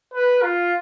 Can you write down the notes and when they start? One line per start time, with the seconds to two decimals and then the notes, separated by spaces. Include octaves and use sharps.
0.14 B4
0.43 F4